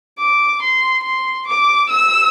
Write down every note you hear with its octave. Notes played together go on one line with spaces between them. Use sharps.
D6
C6
C6
D6
E6